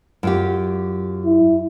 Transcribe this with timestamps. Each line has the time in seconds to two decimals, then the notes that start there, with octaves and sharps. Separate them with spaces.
0.23 F#2 F4 G4
1.25 E4